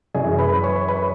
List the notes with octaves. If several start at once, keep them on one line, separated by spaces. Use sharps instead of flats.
F#2 E3 G#4 G#5
B4 B5
C#5 C#6
B4 B5